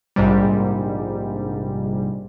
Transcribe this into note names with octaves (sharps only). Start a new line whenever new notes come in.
A#1 G#2 C3 G3